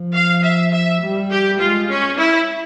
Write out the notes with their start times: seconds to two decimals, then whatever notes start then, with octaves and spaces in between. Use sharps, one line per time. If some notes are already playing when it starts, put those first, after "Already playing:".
Already playing: F3
0.14 F5
0.43 E5
0.73 E5
1.01 G3
1.31 G4
1.60 G#3 F4
1.89 C#4
2.18 E4